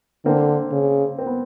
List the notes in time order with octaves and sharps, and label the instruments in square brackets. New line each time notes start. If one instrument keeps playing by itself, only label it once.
[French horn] D3 [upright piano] A#3 C4
[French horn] C#3
[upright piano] C4
B3